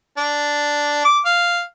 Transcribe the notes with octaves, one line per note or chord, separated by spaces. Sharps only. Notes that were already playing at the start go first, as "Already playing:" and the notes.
D4
D6
F5